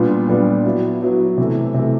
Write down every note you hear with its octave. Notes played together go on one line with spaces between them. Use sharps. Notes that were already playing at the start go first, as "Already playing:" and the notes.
Already playing: A#2 G3 B3 D4 F4
A#2 G3 B3 D4 F4
F#3 B3 E4
F#3 B3 E4
C3 E3 A3
C3 E3 A3